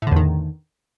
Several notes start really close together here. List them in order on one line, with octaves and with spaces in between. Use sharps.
A2 D3 E2 D#3